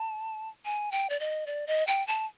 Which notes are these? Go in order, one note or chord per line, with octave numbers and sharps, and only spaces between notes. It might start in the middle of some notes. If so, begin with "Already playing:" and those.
Already playing: A5
G#5
G5
D5
D#5
D5
D#5
G5
A5